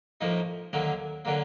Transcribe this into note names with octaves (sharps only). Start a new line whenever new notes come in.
A2 F3 A#3 D#4
D#2 D3 F#3 A#3
D3 F#3 A#3